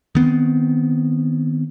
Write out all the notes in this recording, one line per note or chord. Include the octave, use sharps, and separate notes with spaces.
D#3 B3 C4